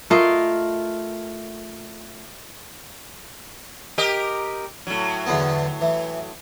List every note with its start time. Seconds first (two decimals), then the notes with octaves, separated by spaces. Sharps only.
0.10 A3 F4 A#4 D#5
3.98 G4 A#4 D#5
4.87 A2 F#3
5.27 E2 D3 B3
5.81 E3